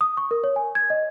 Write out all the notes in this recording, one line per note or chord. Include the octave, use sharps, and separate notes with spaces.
D#6
C#6
A#4
C#5
G#5
G#6
D#5